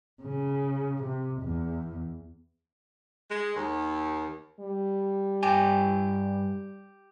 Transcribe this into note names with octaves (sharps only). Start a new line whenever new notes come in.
C#3
C3
E2
G#3
D#2
G3
G2 G4 G#5